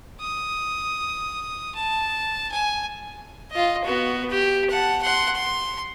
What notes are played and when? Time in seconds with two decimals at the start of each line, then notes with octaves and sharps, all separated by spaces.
0.21 D#6
1.75 A5
2.52 G#5
3.51 F4 D#5
3.84 B3 F#4
4.30 G4
4.70 F#5 A5
5.02 F#5 C6
5.35 C6